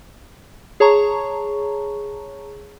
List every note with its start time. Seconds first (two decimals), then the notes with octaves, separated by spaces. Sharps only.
0.80 G#4 C#5 A5 A#5 C#6